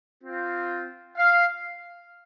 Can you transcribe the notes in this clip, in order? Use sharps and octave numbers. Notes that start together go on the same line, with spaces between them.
C4 F4
F5